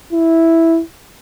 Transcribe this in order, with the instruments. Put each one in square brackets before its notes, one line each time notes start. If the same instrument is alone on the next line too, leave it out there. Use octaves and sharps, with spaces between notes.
[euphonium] E4